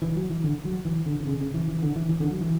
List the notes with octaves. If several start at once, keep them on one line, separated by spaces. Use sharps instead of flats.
E3
F#3
E3
D3
F#3
E3
D3
D3
C#3
C#3
E3
E3
D3
E3
E3
D3
F#3
E3